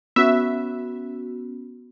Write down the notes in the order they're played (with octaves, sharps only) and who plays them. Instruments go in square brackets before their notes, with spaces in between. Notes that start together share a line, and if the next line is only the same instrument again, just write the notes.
[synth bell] B3 C#4 F#4 [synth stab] E5